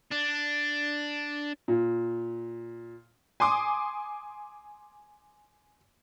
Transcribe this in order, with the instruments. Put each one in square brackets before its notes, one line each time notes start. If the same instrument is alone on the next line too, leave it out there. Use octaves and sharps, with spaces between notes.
[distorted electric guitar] D4
[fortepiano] A#2
[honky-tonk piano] G#5 C6 D6 D#6